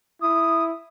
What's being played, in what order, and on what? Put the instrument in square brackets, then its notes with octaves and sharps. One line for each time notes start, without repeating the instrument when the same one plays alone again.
[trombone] E4 [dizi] D#6